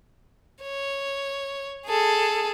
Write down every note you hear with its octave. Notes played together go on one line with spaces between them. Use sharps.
C#5
G#4 A4